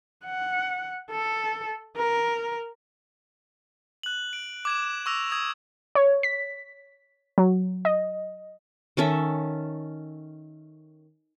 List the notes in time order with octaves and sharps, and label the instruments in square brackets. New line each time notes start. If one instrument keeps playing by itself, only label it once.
[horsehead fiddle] F#5
A4
A#4
[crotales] F#6 F#7
D7
D6 G#6 E7
C#6 D6 E6 A#6 F7
D#6 G#6
[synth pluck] C#5
B6
F#3
D#5
[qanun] D#3 C#4 A4 E5